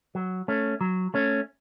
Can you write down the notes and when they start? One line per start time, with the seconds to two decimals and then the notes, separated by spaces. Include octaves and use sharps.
0.15 F#3
0.48 A3 C#4
0.81 F#3
1.14 A3 C#4